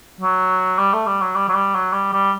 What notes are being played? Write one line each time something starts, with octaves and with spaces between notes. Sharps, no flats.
F#3
G3
A3
G3
F#3
G3
F#3
G3
F#3
G3
G3